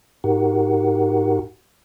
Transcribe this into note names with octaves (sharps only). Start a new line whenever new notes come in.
G#2 D#4 F#4 G4 A#4 F#5